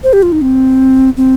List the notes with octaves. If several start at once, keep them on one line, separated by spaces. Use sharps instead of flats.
C5
G4
F4
D#4
C4
C4